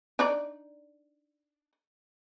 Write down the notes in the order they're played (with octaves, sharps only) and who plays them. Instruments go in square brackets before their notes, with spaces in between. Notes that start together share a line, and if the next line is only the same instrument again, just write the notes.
[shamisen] D4 D#4 D5